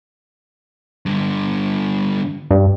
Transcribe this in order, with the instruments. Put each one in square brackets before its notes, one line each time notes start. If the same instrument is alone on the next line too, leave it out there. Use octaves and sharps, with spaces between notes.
[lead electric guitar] G2 D3
[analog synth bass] G2